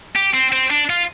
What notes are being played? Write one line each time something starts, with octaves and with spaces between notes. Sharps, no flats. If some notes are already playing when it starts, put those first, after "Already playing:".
G4
C4
C4
D4
F4